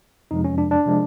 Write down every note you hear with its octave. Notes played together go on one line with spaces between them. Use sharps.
F2 C3 F3 G#3 D#4
C#4
D4
D4
C3 F3 G#3